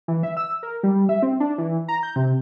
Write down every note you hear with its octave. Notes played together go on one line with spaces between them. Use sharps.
E3
E5
E6
A#4
G3
E5
C4
D4
E3
A#5
G6
C3